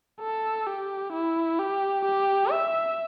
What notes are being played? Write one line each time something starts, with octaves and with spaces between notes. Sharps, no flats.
A4
G4
E4
G4
G4
E5